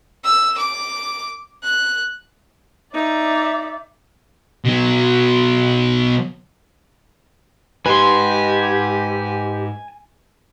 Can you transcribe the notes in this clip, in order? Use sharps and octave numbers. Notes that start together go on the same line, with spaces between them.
E6
D6
F#6
D#4 D5 E5
B2 F#3
G#2 G4 B4 G#5 C6